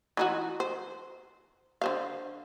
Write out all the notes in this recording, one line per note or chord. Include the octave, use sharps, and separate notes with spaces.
E3 D#4 F#4
C5
D3 C5 F5